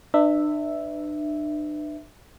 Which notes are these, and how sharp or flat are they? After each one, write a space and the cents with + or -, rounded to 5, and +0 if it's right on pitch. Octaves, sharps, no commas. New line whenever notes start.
D4 +40 B4 +25 E5 +0